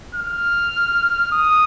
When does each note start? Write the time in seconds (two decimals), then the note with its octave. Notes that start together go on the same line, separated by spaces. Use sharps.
0.15 F6
1.32 D#6